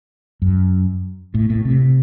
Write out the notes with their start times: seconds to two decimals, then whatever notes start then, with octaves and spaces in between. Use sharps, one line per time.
0.42 F#2
1.34 A2
1.50 A2
1.65 C3